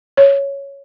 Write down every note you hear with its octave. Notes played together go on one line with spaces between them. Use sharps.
C#5